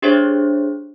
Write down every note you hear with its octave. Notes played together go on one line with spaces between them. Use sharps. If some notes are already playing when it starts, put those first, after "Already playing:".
D4 G4 G#4 C5 C#5 E5